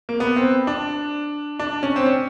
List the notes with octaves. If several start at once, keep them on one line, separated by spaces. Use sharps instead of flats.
A#3
B3
C4
D4
D4
C#4
C4
C#4